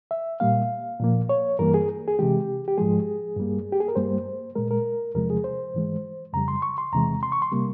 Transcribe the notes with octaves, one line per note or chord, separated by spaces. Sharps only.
E5
A#2 G3 A#3 F5
A#2 F3 A#3
C#5
G2 E3 G3 A#3 A#4
G#4
G#4
C3 E3 G#3 G4
G4
G#2 F3 G#3 G#4
G2 G3 A#3
G4
G#4
A#4
G2 G3 A#3 C5
A#2 G#3 A#4
A#4
E2 C3 F3 G#3 A#4
G#4
C5
G#2 E3 G#3
F2 C#3 G3 A#5
C6
C#6
C6
E2 C3 E3 G#3 A#5
C6
C#6
C6
C3 G3 A#3